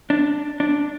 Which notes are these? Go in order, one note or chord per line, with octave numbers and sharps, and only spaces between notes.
D4
D4